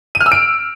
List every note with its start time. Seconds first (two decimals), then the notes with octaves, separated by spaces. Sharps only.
0.15 D#7
0.20 F6
0.26 E6
0.32 D7